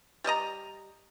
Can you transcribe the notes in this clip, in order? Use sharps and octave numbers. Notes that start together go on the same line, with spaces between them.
G3 D5 D#5 A#5